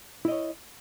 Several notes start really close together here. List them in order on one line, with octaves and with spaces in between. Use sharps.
E4 D#5 C#5